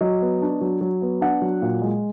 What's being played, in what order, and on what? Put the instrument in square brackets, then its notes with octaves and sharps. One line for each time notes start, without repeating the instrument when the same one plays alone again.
[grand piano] F#3 D#5
B3
D4
F#3
F#3
B3
D4 F#5
F#3
A#2
G#3